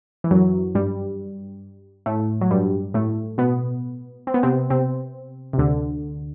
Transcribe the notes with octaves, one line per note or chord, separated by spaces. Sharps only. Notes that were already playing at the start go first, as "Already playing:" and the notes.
E3
F#2 F#3
G2 G3
A2 A3
F#3
G2 G3
A2 A3
B2 B3
C4
B3
C3 C4
C3 C4
C3
D2 D3